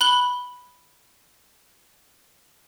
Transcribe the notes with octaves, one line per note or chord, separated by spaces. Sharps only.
B5 F#6 F#7 G7